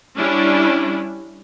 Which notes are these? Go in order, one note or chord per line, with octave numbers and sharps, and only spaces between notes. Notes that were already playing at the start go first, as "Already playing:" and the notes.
G3 C#4 D4 E4